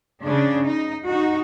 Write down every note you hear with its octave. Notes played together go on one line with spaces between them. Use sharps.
C#3 D4
D#4
D#4 F#4